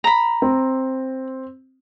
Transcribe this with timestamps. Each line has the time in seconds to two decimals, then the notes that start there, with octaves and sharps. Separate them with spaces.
0.04 A#5 B5
0.42 C4